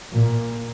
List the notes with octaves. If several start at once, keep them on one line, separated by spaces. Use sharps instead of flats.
A#2